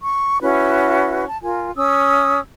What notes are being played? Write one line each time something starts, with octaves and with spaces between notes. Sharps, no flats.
C#6
C#4 E4 F#4 B4
A5
F4 A#4 G#5
C#4 D#6 E6